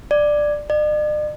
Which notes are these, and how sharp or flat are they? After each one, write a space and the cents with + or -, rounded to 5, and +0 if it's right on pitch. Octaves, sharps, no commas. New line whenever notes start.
D5 +10
D5 +45